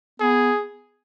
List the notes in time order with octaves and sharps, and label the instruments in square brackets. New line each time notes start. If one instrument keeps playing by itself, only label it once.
[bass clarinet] B3 [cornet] G#4